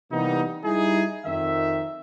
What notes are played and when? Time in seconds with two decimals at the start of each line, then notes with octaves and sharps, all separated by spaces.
0.11 C3 E3 G3 A#3 B3 D#4
0.64 G3 D#4 E4 G#4
1.25 F2 D#3 E5